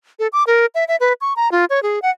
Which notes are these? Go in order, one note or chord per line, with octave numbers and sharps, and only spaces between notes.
A4
D6
A#4
E5
E5
B4
C#6
A#5
F4
C#5
G#4
F#5